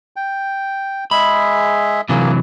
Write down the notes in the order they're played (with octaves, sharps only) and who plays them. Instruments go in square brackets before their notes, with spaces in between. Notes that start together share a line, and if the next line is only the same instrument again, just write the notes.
[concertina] G5
[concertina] G#3 G#4 E5 [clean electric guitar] B5
[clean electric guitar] C3 E3 F#3 [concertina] A#3 G#4